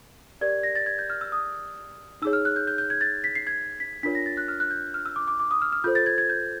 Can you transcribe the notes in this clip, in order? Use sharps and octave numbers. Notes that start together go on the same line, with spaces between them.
G4 A#4 D5 G#6
A#6
A6
G#6
G6
F6
E6
D#6
D#4 G#4 C#5 E6
F6
F#6
G6
G6
G6
G#6
A6
B6
C7
G#6
B6
D4 F4 A#4 C#5 B6
A#6
A6
F#6
F6
F#6
G6
F6
E6
D6
D6
D6
D#6
F6
F6
F4 A4 C5 G6
A6
G#6
G#6
G6